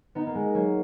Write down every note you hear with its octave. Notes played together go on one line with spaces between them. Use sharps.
B3 D#4
A#3
G#3
F#3 A#3